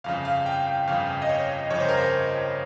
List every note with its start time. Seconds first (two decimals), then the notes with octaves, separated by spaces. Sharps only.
0.04 G1 F2 C#3 F5
0.25 F5
0.46 G5
0.67 G5
0.87 G1 F2 C#3 F5
1.22 D#5
1.29 C#5
1.70 G1 F2 C#3 C#5
1.80 C5
1.89 A#4
1.97 C5